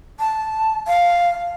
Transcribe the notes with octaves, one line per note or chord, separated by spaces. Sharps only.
A5
F5